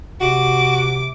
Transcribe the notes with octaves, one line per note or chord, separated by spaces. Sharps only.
C3 F#4 D6